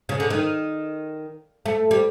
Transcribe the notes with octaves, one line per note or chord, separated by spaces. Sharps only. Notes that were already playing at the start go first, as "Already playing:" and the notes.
C#3
D3
D#3
A3
G3